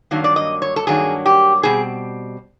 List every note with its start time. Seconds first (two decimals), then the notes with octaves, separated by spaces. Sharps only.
0.11 G2 D#3 F#3 A#3 D4
0.24 D5
0.36 D#5
0.62 C#5
0.76 A4
0.87 G2 D#3 F#3 A#3 D4 G#4
1.26 G4
1.63 B2 G3 C4 G#4